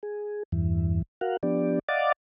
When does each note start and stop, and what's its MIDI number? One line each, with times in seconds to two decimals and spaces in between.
0.03 0.43 68
0.52 1.02 40
0.52 1.02 43
0.52 1.02 52
1.21 1.37 66
1.21 1.37 70
1.21 1.37 77
1.21 1.37 78
1.43 1.79 53
1.43 1.79 59
1.43 1.79 62
1.43 1.79 67
1.43 1.79 74
1.89 2.12 74
1.89 2.12 75
1.89 2.12 77
1.89 2.12 78
1.89 2.12 86
1.89 2.12 93